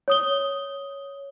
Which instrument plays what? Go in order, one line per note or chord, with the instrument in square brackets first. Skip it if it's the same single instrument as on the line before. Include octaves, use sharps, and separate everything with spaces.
[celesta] C#5 D#6 G7